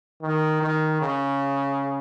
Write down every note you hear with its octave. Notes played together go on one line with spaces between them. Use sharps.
D#3
D#3
C#3